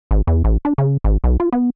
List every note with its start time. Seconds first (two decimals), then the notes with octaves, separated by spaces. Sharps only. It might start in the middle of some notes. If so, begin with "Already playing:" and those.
0.11 G#1
0.27 E2
0.44 A1
0.65 D4
0.78 C#3
1.04 G#1
1.24 B1
1.40 F4
1.53 B3